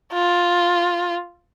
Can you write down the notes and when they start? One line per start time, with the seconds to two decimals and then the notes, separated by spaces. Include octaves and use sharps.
0.13 F4